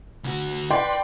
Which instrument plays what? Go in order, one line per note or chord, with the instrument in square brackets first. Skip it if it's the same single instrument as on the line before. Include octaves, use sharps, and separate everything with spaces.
[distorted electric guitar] D2 F#4
[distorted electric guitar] B4 [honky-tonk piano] D5 G5 C6